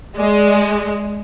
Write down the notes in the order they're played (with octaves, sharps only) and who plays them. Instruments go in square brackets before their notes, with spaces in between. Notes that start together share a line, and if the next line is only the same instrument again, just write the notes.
[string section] G#3 [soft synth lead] D5